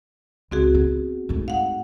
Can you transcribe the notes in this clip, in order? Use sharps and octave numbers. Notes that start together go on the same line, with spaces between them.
C#2 C4 F#4 G#4
B3
G#2 A3
F5 F#5